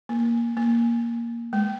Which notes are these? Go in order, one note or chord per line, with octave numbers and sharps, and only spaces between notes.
A#3
A#3
G#3